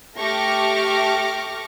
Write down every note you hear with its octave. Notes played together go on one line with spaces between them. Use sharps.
A3 G4 C#6 D6 F6 A#6